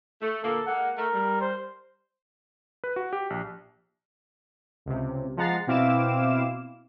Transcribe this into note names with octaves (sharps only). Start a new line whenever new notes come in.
A3
A#2 D3 A#3 A4
G#3 A#3 F#5
A3 A#4
G3
C5
B4
F#4
G4
A#1
C#2 C3
F3 G#3 F#5 A#5 A6 C7
B2 C4 E4 F5 D6 E7